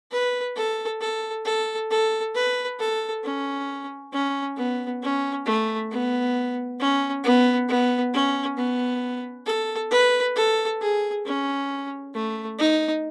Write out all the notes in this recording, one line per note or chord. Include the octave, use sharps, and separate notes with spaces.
B4
A4
A4
A4
A4
B4
A4
C#4
C#4
B3
C#4
A3
B3
C#4
B3
B3
C#4
B3
A4
B4
A4
G#4
C#4
A3
D#4